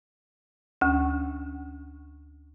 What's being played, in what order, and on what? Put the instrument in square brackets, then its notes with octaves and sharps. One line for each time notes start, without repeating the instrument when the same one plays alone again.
[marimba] D2 C#4